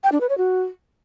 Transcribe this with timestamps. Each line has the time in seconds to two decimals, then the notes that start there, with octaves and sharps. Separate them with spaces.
0.03 G5
0.12 D4
0.21 B4
0.29 C#5
0.38 F#4